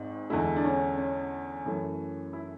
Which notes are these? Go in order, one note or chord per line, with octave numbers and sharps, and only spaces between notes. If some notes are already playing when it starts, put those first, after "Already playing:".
Already playing: G#1 G#2
E2 D3 G#3 E4
D4
C#4
C#4
F#2 E3 A3
E4